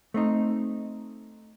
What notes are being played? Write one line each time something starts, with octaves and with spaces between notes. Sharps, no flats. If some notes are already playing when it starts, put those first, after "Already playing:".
A3 C4 D#4